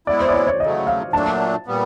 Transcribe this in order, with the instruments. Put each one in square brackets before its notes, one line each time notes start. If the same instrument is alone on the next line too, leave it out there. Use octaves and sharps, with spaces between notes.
[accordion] G#3 B3 E4 [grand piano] D5
[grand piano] C5
D5
C#5
C#5
[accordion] C#3 F#3 A3 [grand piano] D#5
[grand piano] F5
[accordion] A#2 F#3 A3 D4 [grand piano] A5
[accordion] A#2 G3 B3